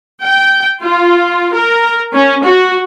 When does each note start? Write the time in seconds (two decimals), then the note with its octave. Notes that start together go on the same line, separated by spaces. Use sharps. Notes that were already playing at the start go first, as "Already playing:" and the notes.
0.23 G5
0.83 F4
1.52 A#4
2.13 C#4
2.43 F#4